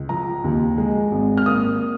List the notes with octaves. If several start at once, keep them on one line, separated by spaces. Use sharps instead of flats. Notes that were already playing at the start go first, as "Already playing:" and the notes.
Already playing: C#2
F3 A#5
D#2
G#3
G#1
F6
A#3 D#6